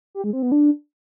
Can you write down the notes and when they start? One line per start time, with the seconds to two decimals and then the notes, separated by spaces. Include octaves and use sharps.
0.15 G4
0.24 G#3
0.33 C4
0.42 B3
0.52 D4